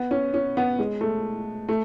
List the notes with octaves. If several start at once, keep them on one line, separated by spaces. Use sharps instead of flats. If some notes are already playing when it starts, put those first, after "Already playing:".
Already playing: B3
C#4
C#4
B3
G#3
A3
A3